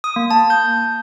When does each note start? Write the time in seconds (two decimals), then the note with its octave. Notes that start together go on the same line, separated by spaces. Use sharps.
0.04 D#6
0.16 A#3
0.31 A5
0.50 G6